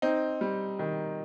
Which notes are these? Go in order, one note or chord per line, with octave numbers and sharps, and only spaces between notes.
C4 D#4
G3
D#3